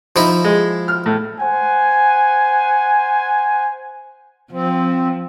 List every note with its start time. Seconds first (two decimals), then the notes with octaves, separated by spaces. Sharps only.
0.16 F3 D#4 E4
0.44 G#3
0.88 F6
1.06 A2
1.40 C5 F#5 G#5
4.52 F3 C4